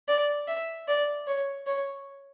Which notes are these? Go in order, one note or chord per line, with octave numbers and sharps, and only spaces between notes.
D5
E5
D5
C#5
C#5